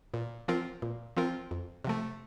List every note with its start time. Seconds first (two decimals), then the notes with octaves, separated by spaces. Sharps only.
0.14 A#2
0.48 F3 C4 F4 A#4
0.82 A#2
1.17 F3 C4 F4 A#4
1.51 F2
1.84 C3 F3 A3